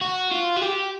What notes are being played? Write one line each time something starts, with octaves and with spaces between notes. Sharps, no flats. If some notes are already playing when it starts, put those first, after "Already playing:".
F#4
F4
F#4
G4